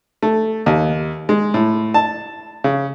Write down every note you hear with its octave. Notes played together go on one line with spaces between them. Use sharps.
A3
D#2
G#3
A2
A5
C#3